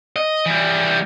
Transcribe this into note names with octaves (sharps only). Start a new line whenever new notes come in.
D#5
E3 G3